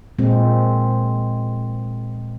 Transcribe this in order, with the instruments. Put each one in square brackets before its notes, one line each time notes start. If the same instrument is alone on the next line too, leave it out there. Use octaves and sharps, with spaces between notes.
[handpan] A#2 G#3 C4